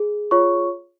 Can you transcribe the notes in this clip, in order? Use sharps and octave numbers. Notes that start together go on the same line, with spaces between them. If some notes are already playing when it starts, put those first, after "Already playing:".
Already playing: G#4
F4 C#5 C#6